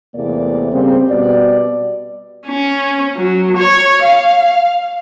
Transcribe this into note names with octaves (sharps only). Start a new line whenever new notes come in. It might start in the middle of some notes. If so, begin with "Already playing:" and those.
E2 C3 A3 A#3 D5
C#3 G3 A#3 C4
B2 G3 D5
C#4
F#3
C#5
F5